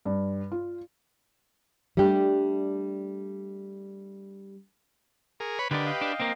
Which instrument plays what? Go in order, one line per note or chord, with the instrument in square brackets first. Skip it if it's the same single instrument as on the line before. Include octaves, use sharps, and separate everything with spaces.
[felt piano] G2
F4
[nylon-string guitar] G3 A3 D4 G4
[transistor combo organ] G#4 A#4 [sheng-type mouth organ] C#6
[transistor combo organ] B4 C#5 B5
[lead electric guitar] D3 D4 [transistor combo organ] G4 B4 [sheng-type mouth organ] A#4 D5 D#5
[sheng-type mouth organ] D#5 F5 G5
[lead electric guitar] D4
A#3 C4